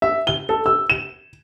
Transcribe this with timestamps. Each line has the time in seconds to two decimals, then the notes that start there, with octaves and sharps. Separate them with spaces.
0.02 E5
0.27 G7
0.49 A4
0.66 E6
0.90 E7